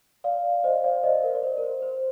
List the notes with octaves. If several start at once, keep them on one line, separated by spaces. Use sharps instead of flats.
D5 F5
C5 D#5
D5 F5
C5 D#5
A#4
D5
C5
A#4
C5
C5